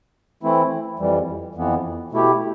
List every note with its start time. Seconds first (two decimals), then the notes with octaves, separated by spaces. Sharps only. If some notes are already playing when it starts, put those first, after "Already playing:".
0.43 E3 A3 C4 E4
0.99 F2 E3 G3
1.55 F2 E3 B3
2.12 B2 A3 E4 G4